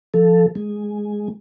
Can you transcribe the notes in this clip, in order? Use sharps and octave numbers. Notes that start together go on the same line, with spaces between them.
F3 A4
G#3